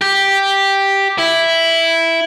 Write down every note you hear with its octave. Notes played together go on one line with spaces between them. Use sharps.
G4
E4